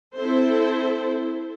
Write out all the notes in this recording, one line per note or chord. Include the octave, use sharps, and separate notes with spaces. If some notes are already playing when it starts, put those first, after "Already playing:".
C4 E4 A4 C5